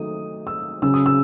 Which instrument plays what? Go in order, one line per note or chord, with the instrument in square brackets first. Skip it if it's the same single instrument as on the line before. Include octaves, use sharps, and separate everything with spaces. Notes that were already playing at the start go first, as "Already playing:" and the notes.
Already playing: [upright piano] D#3 F#3 A3 D#4 D#6
E6
C#3 F#3 C#4 E6
D#6
E6